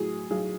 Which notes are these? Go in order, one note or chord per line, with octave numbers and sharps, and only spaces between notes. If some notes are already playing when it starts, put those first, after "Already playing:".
Already playing: A2 F#3 G#4
B1 G#4